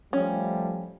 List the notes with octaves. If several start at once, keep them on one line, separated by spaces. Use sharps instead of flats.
F3 G3 A3 C#4